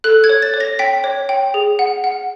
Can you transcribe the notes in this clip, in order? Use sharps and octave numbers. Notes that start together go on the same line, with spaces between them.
A4 F#6
G#6
C#5
A6
C#5
A#6
G5 B6
C#5
G5
G#4
F#5
F#5